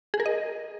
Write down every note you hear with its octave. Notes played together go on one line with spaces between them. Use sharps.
G#4
A#4
D#5